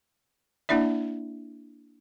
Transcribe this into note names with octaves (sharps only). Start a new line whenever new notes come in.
A#3 D4 E4 D5 E5